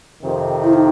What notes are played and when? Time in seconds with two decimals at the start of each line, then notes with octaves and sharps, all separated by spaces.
0.22 F2 C3 D#3
0.63 E4
0.73 D#4